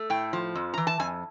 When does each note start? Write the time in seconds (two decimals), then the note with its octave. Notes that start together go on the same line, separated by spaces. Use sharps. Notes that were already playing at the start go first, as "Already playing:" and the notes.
Already playing: A3
0.10 A2 G5
0.33 F3
0.55 F2
0.74 E3 A#5
0.87 A5
1.00 F2 G#5